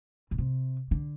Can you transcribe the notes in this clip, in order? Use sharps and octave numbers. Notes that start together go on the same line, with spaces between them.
B2
C3
D3